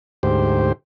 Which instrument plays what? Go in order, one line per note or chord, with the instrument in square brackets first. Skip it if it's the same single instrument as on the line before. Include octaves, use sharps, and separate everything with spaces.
[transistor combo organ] D2 G#2 G4 C5